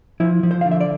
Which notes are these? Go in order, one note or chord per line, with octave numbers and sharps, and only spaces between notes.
F3 E4
F3
C5
D3 F5
E5
D5